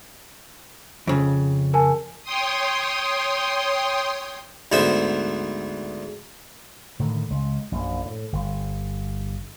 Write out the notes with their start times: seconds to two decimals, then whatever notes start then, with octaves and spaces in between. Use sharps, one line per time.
1.07 F2 C#3
1.74 A#4 G#5 A5
2.23 C#5 G5 C6 D#6
4.72 D2 G#2 B3 C5 E5
6.99 A2 D3 D#3
7.30 C#2
7.72 A#1 F#2
8.05 A2
8.33 G1